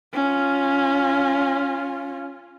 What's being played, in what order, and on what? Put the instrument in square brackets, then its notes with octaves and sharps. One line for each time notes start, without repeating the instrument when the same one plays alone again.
[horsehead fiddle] C#4 F4